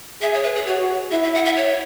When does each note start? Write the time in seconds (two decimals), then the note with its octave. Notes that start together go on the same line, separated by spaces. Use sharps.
0.22 G#4 E5
0.34 C#5
0.44 B4
0.55 G#4
0.67 F#4 C#5
1.11 E4 E5
1.23 E5
1.34 F#5
1.45 E5
1.57 C#5